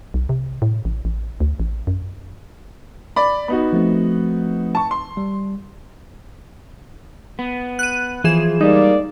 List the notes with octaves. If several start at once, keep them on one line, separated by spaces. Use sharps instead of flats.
B1
C3
A2
A1
A1
D2
A1
F#2
D5 B5
B3 D#4 F#4 B5
F3 A3 C4
A5 C#6
C6
G3
B3
F#6 D#7
E3 F3 G#4 E7
G3 G#3 A#3 D#4 D5